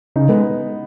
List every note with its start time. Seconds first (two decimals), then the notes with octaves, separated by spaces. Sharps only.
0.16 C#3 D#4
0.29 G#3 B3